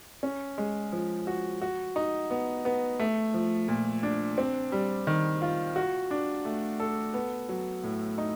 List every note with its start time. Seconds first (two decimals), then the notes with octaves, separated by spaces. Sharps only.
0.23 C#4
0.58 G#3
0.93 F3
1.27 F#4
1.62 F#4
1.96 D#4
2.30 B3
2.65 B3
2.99 A3
3.34 F3
3.68 A#2
4.03 D4
4.38 C4
4.72 G3
5.07 D#3
5.42 F4
5.76 F#4
6.11 D4
6.45 A3
6.80 A4
7.14 B3
7.49 F#3
7.83 A2
8.18 D#4